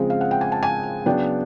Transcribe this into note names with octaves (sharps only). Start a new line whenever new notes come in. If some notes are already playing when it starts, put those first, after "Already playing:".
Already playing: C#3 F3 G#3 C4
F5
F#5
G5
G#5
A5
G#5
C#3 F#3 B3 D4 G5